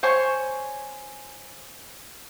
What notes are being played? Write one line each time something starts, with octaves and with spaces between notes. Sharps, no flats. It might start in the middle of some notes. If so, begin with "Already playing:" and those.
C5 C#5 G#5 C#6